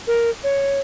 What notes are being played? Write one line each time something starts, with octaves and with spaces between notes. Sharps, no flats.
A#4
C#5